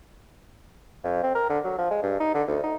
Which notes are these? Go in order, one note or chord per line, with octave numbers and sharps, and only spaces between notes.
F2
C4
A#4
D3
F#3
F3
G#3
G2
D#4
D3
D2
D#4